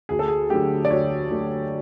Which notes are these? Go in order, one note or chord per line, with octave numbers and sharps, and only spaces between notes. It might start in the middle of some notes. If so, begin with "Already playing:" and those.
D2 G#4
A4
G#4
D3 F#3 A3 G4
D5
D2 C#5
D3 F#3 A3